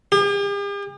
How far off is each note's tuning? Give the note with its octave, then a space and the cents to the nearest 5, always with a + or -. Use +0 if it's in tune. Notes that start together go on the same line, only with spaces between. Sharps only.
G4 +45